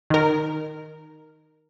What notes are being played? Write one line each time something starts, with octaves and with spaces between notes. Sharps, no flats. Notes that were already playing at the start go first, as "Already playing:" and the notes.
D#3 A#4